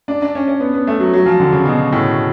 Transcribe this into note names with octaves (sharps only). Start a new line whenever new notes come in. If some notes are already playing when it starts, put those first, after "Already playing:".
D4
D4
C#4
C#4
B3
B3
A3
F#3
F#3
F3
D3
C#3
B2
A2